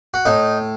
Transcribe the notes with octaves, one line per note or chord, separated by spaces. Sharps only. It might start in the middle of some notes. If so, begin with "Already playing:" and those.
F#4
A2 D#4